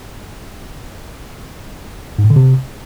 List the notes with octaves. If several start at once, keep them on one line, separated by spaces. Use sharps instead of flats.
G#2
A2
D3
C3